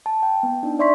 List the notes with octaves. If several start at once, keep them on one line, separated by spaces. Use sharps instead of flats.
A5
G5
B3
D4 D#4
D5 E5 C6 C#6 B6